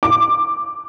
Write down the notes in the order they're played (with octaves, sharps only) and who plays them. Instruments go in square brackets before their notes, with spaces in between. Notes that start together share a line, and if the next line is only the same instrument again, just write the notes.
[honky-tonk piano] D6